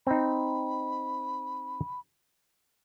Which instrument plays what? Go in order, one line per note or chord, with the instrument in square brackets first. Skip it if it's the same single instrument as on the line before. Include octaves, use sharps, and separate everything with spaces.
[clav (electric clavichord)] C4 D#4 [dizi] B5